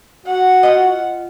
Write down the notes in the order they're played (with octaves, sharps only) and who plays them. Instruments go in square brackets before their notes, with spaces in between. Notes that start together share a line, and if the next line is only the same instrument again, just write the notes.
[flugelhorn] F#4 [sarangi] F#5
[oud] F4 D#5